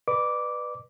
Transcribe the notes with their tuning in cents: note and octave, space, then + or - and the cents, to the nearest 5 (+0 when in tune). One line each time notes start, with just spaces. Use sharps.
B4 +0 D5 +35 D6 -10